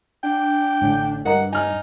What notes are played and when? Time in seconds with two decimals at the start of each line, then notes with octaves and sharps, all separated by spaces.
0.23 D4 G5
0.81 A1 D3
1.25 G2 A#4 D#5 F#5 A#5
1.52 D#4 G#5 F6